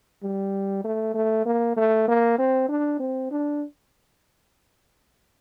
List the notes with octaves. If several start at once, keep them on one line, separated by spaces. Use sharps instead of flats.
G3
A3
A3
A#3
A3
A#3
C4
D4
C4
D4